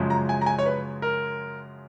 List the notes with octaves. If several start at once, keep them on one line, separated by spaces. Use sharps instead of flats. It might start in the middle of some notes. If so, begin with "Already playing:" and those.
Already playing: F#2 C#3 F3 G#3
A#5
G#5
A#5
G#5
C#5
B4
A#4